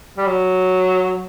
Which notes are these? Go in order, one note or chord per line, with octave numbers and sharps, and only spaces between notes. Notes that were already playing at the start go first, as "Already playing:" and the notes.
G3
F#3